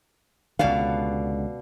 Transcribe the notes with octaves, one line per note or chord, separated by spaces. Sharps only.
C#2 B2 D3 D5 F5